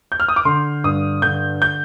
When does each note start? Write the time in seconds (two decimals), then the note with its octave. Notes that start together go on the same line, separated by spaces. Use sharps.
0.12 G6
0.20 F6
0.28 D#6
0.36 D6
0.45 D3 C6
0.84 G2 D#6
1.22 D3 G6
1.62 G6